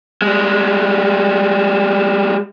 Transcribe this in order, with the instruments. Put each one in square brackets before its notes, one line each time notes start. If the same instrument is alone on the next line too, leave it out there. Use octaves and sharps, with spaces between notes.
[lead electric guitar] G3 G#3